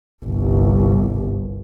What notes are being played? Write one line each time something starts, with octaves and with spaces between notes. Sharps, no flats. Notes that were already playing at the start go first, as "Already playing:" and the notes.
G1 C2